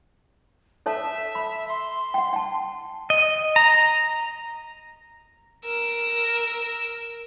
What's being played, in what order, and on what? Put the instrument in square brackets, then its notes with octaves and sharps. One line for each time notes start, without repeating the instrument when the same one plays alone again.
[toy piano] A4 C#5 A5 [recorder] E5
[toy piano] B5
[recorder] C6
[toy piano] F#5 G5
G5 A5
[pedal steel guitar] D#5
A#5
[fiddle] A#4 E6